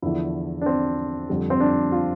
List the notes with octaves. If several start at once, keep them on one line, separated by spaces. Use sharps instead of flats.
E2 D3 F3 E4
D4
C4
F2 D3 G3
C4
D4
F4